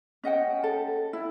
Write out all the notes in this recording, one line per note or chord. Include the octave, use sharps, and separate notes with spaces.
C#4 D#5 F#5 G5
A4
E4